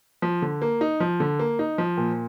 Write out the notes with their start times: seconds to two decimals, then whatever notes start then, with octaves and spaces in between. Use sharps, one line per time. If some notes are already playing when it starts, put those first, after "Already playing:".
0.22 F3
0.42 D3
0.62 A#3
0.81 D#4
1.00 F3
1.20 D3
1.39 A#3
1.59 D#4
1.78 F3
1.98 A#2